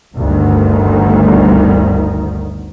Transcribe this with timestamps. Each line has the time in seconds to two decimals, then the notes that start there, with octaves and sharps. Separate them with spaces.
0.15 G1 D2 D#3